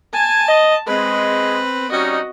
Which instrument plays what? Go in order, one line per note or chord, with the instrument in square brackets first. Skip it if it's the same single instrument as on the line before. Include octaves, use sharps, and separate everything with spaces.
[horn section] G#5 [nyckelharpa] A5
[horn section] D#5
[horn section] G#3 [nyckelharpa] C4 B4
[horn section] G3 C#4 D#4 [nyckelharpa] F#4 D#5